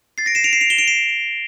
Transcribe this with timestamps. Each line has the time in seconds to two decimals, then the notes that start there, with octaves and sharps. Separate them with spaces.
0.18 A6 C7
0.26 A#6 D7
0.35 C7 E7
0.44 D7 F7
0.53 C7 E7
0.61 D7 F7
0.70 E7 G7
0.78 D7 F7
0.88 C7 E7